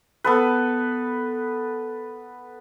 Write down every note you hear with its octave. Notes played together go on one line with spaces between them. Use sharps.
B3 A4 B4